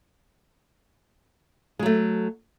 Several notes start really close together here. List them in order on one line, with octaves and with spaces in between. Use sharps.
G#3 F#3 A3